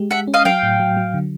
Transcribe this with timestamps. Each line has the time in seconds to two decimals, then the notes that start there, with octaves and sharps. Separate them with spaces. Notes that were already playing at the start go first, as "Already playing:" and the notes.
Already playing: G#3 G4
0.11 G#3 E5 F#5
0.28 C#4
0.34 D#5 F5
0.45 F#3 F5 G5
0.63 A2
0.80 F#3
0.97 F#3
1.14 D3